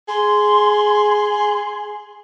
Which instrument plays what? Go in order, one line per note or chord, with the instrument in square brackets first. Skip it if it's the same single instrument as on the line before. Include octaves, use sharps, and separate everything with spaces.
[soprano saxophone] G#4 [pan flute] C6